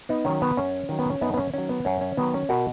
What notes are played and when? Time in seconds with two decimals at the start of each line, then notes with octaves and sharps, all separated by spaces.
0.09 B3 D#4
0.25 D#3 F#3 C#4
0.42 B3
0.57 F#2 C#4
0.89 D#3 F#3
0.99 B3
1.10 C#4
1.21 F#2 B3 D#4
1.34 B3
1.38 C#4
1.54 D#3 F#3 C#4
1.69 B3
1.85 F#2 C#4
2.01 C#4
2.17 D#3 F#3 B3
2.34 C#4
2.49 B2 F#4 A#4